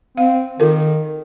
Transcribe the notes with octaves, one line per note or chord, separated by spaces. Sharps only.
C4 F5
D#3 F4 A4 A#4